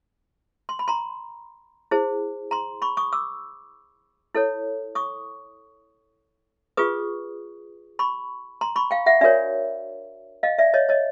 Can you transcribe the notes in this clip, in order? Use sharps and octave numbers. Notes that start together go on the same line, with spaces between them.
C6
B5
A#5 C6
E4 G#4 C5
A#5 C6
B5 C#6
C#6 D#6
D6 E6
E4 A4 C#5
C#6 D#6
F4 G#4 B4 C#6 D#6
B5 C#6
A#5 C6
B5 C#6
F5 G5
E5 F#5
D4 F#4 A#4 C#5 D5 E5
D#5 F5
D5 E5
C#5 D#5
C#5 D#5